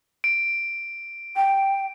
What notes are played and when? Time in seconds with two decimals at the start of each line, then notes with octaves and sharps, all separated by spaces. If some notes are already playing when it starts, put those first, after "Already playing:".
0.24 D7
1.36 G5